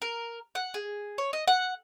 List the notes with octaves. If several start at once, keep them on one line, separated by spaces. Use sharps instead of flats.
A#4
F#5
G#4
C#5
D#5
F#5